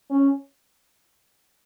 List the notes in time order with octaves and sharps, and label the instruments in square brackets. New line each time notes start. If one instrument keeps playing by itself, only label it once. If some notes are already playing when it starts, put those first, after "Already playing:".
[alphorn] C#4